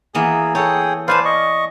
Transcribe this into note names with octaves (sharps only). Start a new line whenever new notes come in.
E3 A#3 B3 G#4
G#4 A4 C#5 G5 D#6
B4 C5 D5 F5 G#5 A5
D#5 C#6